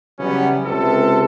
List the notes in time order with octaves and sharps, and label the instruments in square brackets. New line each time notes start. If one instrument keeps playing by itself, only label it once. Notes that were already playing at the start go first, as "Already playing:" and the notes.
[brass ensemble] C#3 E3 F#3 G3 B3 C#4
C#2 C3 G#4 A4